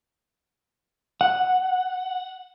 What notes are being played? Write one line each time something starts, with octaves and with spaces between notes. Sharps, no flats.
F#5